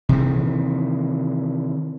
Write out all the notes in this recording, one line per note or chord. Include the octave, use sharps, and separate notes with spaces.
C3 D#3 E3